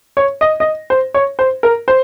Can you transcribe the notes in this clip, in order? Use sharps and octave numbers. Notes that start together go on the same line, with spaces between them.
C#5
D#5
D#5
C5
C#5
C5
A#4
C5